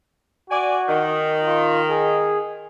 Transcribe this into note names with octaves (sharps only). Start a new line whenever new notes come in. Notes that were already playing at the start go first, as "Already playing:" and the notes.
F#4 D5 G#5
D#3
F4
G#4